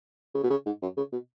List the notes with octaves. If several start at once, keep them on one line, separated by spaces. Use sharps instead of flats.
C#3
B2
C#3
G#2
F#2
C#3
B2